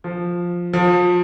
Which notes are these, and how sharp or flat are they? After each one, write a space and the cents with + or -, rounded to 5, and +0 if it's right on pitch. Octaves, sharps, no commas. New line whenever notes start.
F3 +5
F3 +30